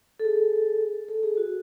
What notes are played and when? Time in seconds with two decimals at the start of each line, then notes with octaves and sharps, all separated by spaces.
0.20 A4
0.25 G#4
1.08 A4
1.23 G#4
1.37 F#4